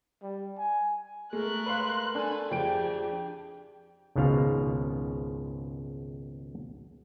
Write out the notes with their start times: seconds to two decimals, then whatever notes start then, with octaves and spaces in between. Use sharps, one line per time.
0.23 G3
0.58 G#5
1.33 G#3 A3 A#4 F#6
1.66 B4 F5 C6
2.15 D4 A4 G#5
2.51 F2 G4 G#4 G5 D7
4.15 G#1 C#2 G#2 B2 F5